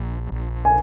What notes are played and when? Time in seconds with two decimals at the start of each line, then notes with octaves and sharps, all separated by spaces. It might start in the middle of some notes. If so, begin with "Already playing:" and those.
Already playing: A#1
0.32 A#1
0.65 G#5